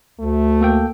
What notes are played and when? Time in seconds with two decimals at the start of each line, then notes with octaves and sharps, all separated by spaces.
0.19 D2 A3
0.61 A#3 A4 G5